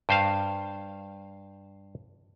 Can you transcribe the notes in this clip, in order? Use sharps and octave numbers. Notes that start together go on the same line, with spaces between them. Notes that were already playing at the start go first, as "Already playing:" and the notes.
G2 C5 F5